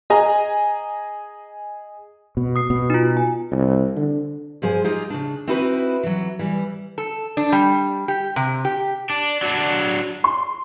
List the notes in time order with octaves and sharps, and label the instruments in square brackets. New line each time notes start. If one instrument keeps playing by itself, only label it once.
[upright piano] G#4 D#5 G#5 A#5
[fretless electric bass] B2
[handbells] D#6 C7
[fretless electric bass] B2
[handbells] D#4 F4
G#5
[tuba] C2
D3
[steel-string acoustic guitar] G2 F3 G#4 C5 G#5
G#3 D#4 F4 G4
C#3 D4
C4 D#4 E4 F#4 A4 B4
E3 F#3
E3 G3
[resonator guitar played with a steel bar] A4
D4
G3
G4
C3
G4
[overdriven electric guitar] D4
F#3 D4
[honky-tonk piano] C6